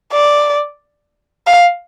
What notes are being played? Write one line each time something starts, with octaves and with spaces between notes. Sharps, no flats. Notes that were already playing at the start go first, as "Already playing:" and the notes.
D5
F5